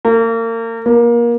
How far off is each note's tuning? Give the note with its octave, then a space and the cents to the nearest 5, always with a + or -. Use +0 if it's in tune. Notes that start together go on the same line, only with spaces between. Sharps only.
A#3 -35
A#3 +25